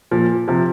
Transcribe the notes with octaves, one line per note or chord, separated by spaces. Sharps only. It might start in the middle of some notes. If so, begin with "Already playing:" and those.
A#2 F3
C3 F3